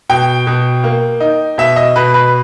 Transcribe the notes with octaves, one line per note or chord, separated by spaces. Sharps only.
B2 G5
B2
A#3
D#4
B2 E5
D#5
B2 B4
B4